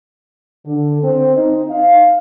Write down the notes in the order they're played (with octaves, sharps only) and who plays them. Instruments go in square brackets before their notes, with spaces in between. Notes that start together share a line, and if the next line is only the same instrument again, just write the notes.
[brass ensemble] D3
C4
D#4
F5